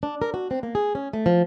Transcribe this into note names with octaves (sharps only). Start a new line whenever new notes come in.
D4
A#4
F#4
C4
A#3
G#4
C#4
A3
F3